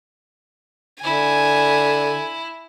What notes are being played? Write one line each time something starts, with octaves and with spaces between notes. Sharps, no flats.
D3 E4 G#5